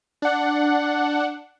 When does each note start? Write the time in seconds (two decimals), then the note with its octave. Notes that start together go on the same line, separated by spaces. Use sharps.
0.22 D4 F#5